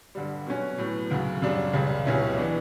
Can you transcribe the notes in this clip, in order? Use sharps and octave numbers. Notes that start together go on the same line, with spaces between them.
G2 D3 G3
B2 F#3 C#4 F#4
A2 F#3 B3
D2 C#3 F#3
F#2 C#3 G3 D4
C#2 C#3 G3
C#2 B2 F#3 C#4 E4
E3 B3 D4